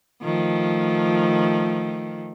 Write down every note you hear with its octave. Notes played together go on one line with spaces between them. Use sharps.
D#3 F3 A3